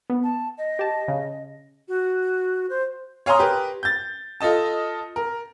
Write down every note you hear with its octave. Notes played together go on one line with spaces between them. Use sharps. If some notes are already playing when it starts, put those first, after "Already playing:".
B3
A5
D#5
G4 A5
C#3
F#4
C5
C#5 F5 G#5 A#5 C6 D#6
G4 A#4 B4
G6 A6
F4 A4 D#5 A5
A#4